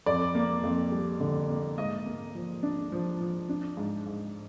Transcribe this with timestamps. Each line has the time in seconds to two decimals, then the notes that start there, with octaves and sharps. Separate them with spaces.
0.06 F2 D5
0.35 A#3
0.64 F2
0.92 G3
1.20 D3
1.49 A#3
1.78 G#2 D#5
2.06 A#3
2.35 F3
2.63 D4
2.92 F3
3.21 F3
3.49 D4
3.77 G#2
4.06 G#2